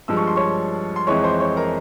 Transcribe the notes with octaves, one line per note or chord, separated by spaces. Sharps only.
G2 F3 G#3 E6
C#6
C6
C#5 C#6
C6
F2 E3 G#3 C#5 C#6
C5 C6
C#5 C#6
A#4 A#5